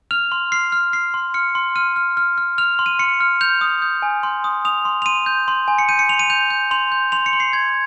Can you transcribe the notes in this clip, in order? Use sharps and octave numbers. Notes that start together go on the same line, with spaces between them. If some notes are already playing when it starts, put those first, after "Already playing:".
F6 F7
C6
F6 C7
F6
F6 C7
C6
F6 C#7
C6
F6 D#7
F6
F6
F6
F6 F7
C6
D#7
C6 C#7
F6
G6 F7
D#6
G6
G#5
C6
D#6
D#6 F7
C6
F7
C6 D#7
G6
C6
G#5
C#7
G6 D#7
C#7
C6 F7
D#7
G6 F7
G6
C6 F7
G6
C6 F7
C#7
C6
C7
C6 G#6